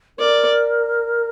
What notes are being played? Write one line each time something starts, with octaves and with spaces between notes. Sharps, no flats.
A#4 D5